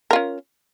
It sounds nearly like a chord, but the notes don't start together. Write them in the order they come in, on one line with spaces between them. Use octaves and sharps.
A#4 F4 C#4